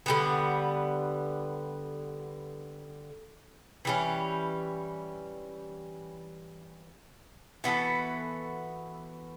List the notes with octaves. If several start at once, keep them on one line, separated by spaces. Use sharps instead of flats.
D3 G3 B3
E3 G3 C#4
E3 B3 F#4 A4